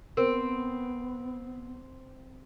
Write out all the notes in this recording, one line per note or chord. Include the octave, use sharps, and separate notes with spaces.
B3 C4 A#4